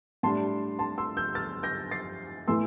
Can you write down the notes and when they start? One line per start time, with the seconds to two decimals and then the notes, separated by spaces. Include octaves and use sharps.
0.23 A2 G3 D4 A5 C6
0.79 A5 C6
0.98 C6 E6
1.17 E6 G6
1.35 F6 A6
1.63 G6 A#6
1.91 A6 C7
2.48 A2 E3 A3 E4 C6 E6